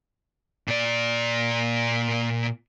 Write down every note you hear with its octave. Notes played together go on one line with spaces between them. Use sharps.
A#2 D5